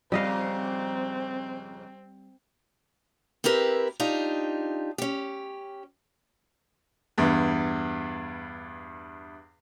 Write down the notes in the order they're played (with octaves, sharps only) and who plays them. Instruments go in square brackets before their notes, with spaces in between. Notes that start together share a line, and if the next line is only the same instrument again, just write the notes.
[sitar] F2 G#2 C#3 [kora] G3 D#5 F5 [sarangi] C4
[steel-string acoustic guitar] C4 E4 G4 A#4 B4
D4 D#4 F4 G4
C#4 G4
[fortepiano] E2 G2